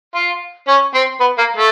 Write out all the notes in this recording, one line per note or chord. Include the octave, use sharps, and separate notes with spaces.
F4
C#4
C4
B3
A#3
A3